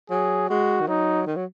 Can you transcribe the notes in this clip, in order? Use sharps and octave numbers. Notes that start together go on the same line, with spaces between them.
F#3 G#4
G#3 F#4
D#3
F#3 D#4
D#3
F#3